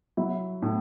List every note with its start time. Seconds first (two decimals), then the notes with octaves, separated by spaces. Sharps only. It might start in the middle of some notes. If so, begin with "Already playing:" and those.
0.17 F#3 E4
0.62 A2